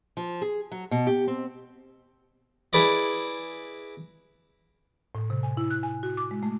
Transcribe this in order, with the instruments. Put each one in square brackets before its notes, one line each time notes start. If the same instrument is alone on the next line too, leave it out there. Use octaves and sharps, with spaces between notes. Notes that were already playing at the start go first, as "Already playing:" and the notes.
[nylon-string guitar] F3
G#4
F#3
B2
G4
C4
[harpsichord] E4 G#4 B4 D5 D#5
[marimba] A2
C3
G#5
E4
F#6
G#5
F#4
D6
G#3
A3